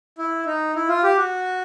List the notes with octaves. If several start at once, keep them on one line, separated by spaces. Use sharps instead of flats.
E4
D#4
E4
F4
G4
F#4